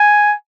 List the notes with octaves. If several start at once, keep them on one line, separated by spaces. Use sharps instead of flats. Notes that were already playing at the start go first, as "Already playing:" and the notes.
Already playing: G#5